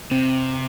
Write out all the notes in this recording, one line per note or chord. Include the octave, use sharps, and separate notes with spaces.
C3 C4